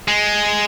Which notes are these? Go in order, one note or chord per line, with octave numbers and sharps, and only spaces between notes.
G#3